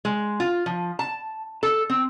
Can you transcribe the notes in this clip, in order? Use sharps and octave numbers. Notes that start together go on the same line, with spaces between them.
G#3
F4
F3
A5
A4
C4